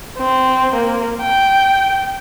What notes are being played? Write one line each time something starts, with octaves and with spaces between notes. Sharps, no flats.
C4
A#3
G5